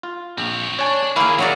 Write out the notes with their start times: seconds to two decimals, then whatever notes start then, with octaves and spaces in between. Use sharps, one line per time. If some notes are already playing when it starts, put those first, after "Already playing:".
0.03 F4
0.38 A#1 C4 C#5
0.79 D4 C#5 G#5 A5
1.16 D#3 A#3 E4 G#4 F5
1.39 A2 F#3 F#4 D5